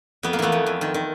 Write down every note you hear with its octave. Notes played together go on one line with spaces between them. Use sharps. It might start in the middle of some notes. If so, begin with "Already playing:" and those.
F2 B3
A#3
E3 A3 B3
F2
F2
D#3
D#3